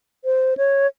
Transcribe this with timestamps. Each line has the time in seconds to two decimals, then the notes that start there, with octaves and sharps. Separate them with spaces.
0.25 C5
0.57 C#5